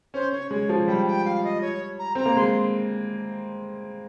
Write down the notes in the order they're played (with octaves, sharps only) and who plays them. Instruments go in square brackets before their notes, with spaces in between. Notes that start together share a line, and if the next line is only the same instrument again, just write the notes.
[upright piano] C#4 [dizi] C5
[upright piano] C#4 [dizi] C#5
[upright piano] G#3 [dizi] C#5
[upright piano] F3
[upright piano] G3 [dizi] G5
[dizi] G5
F5
D#5
C#5
A#5
[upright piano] C4 [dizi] A#5
[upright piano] A#3
[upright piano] G#3 [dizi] C6